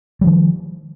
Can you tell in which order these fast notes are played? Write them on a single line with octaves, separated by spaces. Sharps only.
G3 F3 D#3